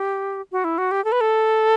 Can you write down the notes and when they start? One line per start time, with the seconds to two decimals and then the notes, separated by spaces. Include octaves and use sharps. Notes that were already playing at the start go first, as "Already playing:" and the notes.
Already playing: G4
0.52 F#4
0.64 E4
0.78 F#4
0.91 G4
1.05 A4
1.12 B4
1.21 A4